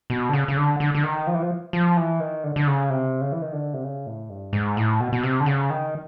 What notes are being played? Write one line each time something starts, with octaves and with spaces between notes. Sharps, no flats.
B2
D3
C#3
C#3
D3
D3
D3
D#3
F3
E3
F3
F3
E3
D#3
D3
D3
C#3
C3
C#3
E3
D#3
D3
C3
C#3
A2
G2
G#2
A2
B2
B2
C3
D3
C#3
D#3